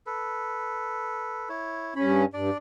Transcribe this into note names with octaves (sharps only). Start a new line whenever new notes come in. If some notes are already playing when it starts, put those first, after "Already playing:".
A4 B4
E4 C#5
G2 C#4 C#5 B5
G2 D4 D5